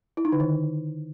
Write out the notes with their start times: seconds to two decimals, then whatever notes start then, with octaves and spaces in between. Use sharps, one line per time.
0.17 E4
0.25 D#4
0.32 D3
0.40 D#3